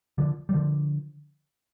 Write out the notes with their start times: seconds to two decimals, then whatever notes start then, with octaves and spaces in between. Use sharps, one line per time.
0.18 D3 F3
0.49 G3
0.54 D3 F3